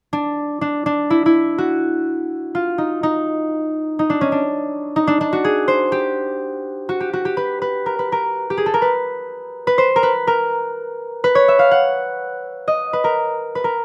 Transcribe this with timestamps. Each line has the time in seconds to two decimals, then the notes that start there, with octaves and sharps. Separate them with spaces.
0.13 D4
0.61 D4
0.86 D4
1.10 E4
1.26 E4
1.58 F#4
2.55 F4
2.78 D#4
3.03 D#4
3.99 D#4
4.10 D4
4.21 C#4
4.32 D4
4.96 D#4
5.07 D4
5.21 D4
5.33 F#4
5.44 G#4
5.68 C5
5.92 G4
6.89 F#4
7.00 G4
7.13 F#4
7.25 G4
7.37 B4
7.62 B4
7.86 A#4
7.99 B4
8.12 A#4
8.50 G4
8.57 G#4
8.66 A4
8.74 A#4
8.82 B4
9.67 B4
9.78 C5
9.96 A#4
10.03 B4
10.27 A#4
11.24 B4
11.35 C#5
11.48 E5
11.59 F5
11.71 F#5
12.68 D#5
12.93 B4
13.04 A#4
13.55 B4
13.64 A#4